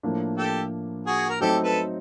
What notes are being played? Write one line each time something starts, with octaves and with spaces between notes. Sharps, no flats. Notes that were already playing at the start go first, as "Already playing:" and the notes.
A2 F3 A#3 D4
G4 A4
F#4 G#4
A#4
F#3 A3 C4 D#4 G4 A4
A4 B4